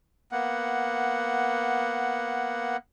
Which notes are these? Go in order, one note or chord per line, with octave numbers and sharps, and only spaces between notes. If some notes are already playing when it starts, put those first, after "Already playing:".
A#3 B3 F#5